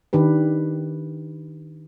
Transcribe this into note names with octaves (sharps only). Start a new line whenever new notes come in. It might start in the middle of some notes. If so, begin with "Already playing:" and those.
D#3 D4 G4 B4